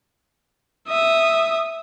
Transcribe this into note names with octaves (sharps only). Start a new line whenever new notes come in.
E5 D#6